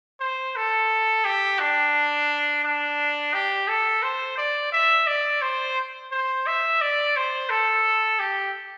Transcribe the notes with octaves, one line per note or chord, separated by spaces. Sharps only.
C5
A4
G4
D4
D4
G4
A4
C5
D5
E5
D5
C5
C5
E5
D5
C5
A4
G4